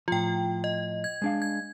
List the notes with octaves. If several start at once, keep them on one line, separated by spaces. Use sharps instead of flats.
A2 F3 F4 G5
D#5
G#6
G#3 D4 F5
G#6